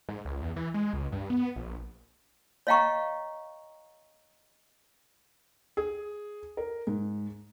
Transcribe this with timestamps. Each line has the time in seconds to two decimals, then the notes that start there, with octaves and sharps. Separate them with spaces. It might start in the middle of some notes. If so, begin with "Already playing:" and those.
0.09 G#2
0.25 C#2
0.42 E2
0.56 E3
0.74 G#3
0.93 C#2
1.12 G2
1.30 B3
1.56 A#1
2.67 C#5 D#5 F5 G5 A#5 C#6
5.77 G#4
6.57 A#4
6.87 G#2